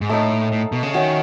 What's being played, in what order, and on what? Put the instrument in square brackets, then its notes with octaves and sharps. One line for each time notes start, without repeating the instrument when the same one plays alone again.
[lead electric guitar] G#2
[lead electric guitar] A2 [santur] A3 D#4 A4
[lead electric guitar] A2
B2
C#3
[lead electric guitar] D#3 [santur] C#4 F#4 C#5 E5